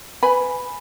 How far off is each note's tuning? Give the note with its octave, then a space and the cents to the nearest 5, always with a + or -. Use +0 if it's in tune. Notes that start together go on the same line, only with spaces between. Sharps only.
B4 +20 G#5 +0 B5 +0